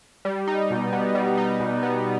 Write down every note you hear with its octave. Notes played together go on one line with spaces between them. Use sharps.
G3
D#4
B2
B3
G3
D#4
B2
B3